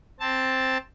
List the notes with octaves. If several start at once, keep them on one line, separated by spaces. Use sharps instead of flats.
C4 A5